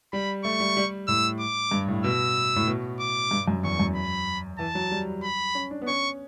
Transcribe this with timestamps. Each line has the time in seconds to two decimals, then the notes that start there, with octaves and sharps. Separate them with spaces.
0.13 G3 B5
0.44 A3 C#6
0.60 G3
0.77 G3
1.08 A2 E6
1.40 D6
1.71 G2
1.88 A2
2.04 B2 E6
2.56 A2
2.68 B2
3.00 D6
3.31 G2
3.48 F#2
3.64 E2 C#6
3.79 F#2
3.95 B5
4.59 E3 A5
4.75 F#3
4.91 G3
5.23 B5
5.55 C#4
5.71 D4
5.82 B3
5.87 C#4 C#6